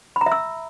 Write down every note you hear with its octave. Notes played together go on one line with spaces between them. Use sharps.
B5
A#5
E5
E6